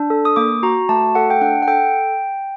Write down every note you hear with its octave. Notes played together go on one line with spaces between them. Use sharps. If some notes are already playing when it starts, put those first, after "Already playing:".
Already playing: D4
A4
D#6
A#3 D6
F#4 A#5
A3 A5
A4 F#5
G5
D4 F#5
F#5
A4 G5